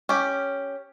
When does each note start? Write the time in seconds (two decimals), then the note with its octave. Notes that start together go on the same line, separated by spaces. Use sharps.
0.09 C#4 G4